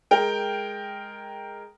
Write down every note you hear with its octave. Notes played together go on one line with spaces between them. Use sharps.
G#3 A#4 G5